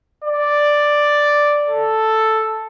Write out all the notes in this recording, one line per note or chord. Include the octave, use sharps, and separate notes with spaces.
D5
A4